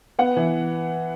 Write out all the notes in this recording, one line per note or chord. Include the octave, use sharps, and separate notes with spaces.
B3 F#5
E3